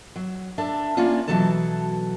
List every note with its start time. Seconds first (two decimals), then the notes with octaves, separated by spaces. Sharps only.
0.16 F#3
0.58 D4 A4 E5
0.97 A#3 C#4 D4 F4
1.28 B2 D#3 E3 F#3 A4 A5